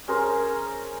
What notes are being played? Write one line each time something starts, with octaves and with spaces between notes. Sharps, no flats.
C#4 G#4 A#4 C5